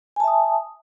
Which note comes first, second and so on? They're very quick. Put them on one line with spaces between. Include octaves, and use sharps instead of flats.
G#5 A5 E5 D#6